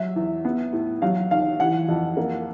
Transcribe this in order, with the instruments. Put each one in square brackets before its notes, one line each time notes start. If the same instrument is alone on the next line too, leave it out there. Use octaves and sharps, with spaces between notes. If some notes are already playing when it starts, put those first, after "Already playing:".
Already playing: [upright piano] F#3 E5
E2
B3
A2
F#3 F5
D#2 F5
E3 F#5
F2
A#3